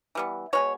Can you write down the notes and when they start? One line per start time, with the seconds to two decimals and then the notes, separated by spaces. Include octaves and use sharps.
0.15 E3 G3 B3
0.53 B2 G#3 B3 C#5